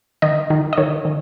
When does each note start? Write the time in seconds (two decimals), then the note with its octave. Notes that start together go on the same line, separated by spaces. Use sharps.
0.22 D#3 D#5
0.50 D#3
0.73 D#5
0.77 D#3 C#5
1.05 D#3